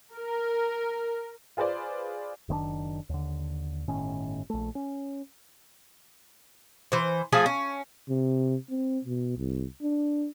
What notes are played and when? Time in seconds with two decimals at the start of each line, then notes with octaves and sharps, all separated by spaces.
0.14 A#4
1.57 F4 G#4 B4 C5 D5
2.49 F#1 D#3 C4 D4
3.09 D#2 D3
3.88 G1 A2 D#3 C#4
4.50 A#1 A3
4.75 C#4
6.92 E3 C5
7.32 F3 A3 G#4 G#5
7.46 C#4
8.09 C3
8.70 C4
9.05 B2
9.38 C2
9.82 D4